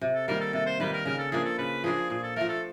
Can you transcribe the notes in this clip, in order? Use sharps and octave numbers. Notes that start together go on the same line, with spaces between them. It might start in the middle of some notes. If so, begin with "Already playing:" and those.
C3
A4
D#3 G3 A#3 A#4
A4
C3 A4
C5
D#3 G3 A#3 B4
A#4
C#3 A#4
A4
F3 A#3 D4 G#4
A4
C#3 B4
F3 A#3 D4 G#4
A#2 G#4
A4
F3 A3 A#4
A4